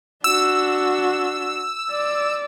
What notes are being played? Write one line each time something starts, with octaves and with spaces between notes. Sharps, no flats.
D4 F#4 E6
D5